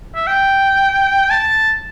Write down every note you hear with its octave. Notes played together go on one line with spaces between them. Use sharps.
E5
G5
A5